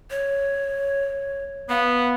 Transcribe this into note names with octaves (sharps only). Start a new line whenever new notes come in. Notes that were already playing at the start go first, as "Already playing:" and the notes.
C#5
B3 F5